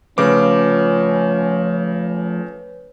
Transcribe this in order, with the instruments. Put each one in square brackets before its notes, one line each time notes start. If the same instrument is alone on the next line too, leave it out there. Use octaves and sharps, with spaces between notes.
[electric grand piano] C#3 D6 [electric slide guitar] F3 A3 F4 [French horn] C#4 [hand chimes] B4 C#5